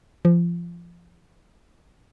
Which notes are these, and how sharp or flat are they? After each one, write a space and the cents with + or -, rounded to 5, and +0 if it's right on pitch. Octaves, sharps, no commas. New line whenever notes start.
F3 -25